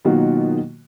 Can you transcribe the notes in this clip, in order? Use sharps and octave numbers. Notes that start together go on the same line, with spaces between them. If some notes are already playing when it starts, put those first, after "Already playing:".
B2 D#3 F#3 A#3 F4 F#4